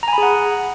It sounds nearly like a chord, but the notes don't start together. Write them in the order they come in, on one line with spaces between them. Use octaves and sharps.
A#5 G#5 B5 G#4 F#5